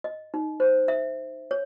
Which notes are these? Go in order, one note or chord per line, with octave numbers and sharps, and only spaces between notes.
D#5
D#4
C5
E5
C#5